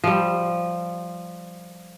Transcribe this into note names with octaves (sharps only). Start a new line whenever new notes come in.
F3 G3